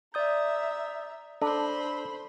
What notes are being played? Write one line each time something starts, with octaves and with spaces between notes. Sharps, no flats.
D5 E5 A#5 D#6 G6
D4 A4 C5 B5